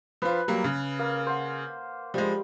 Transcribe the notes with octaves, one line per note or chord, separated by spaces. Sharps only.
F3 F4 B4
F#3 G3 A#3
C#3
A#3
C5 F#5
F3 G3 G#3